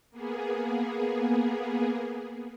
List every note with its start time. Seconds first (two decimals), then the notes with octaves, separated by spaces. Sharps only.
0.11 A#3 B3 G#4